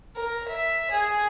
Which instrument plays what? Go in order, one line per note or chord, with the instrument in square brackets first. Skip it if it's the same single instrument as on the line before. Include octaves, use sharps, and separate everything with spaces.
[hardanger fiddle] A#4
E5
G#4